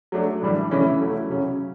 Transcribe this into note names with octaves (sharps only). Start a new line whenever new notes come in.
F#3 A3 D4
A2 E3 G3 D4
C#3 E3 A3 C#4
F#3 A3 E4
C#3 F#3 C#4